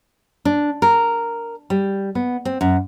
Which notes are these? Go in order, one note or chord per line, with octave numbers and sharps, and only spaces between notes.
D4
A#4
G3
B3
C4
F#2